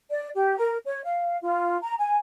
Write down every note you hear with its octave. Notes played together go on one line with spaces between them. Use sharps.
D5
G4
A#4
C#5
F5
F4
A#5
G#5